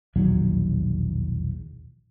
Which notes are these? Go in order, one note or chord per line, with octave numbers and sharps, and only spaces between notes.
E1 A#1 D#2 F#3